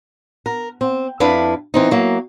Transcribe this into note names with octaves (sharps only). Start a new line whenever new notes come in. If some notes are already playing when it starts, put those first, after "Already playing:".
A#4
C4
F2 D4 E4 B4 F5
E3 C4 D#4
F#3 A#3